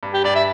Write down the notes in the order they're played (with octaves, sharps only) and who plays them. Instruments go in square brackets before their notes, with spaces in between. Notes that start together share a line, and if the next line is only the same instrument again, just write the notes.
[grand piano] G2
[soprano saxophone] G4
[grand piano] G2 [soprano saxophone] D5
[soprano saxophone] E5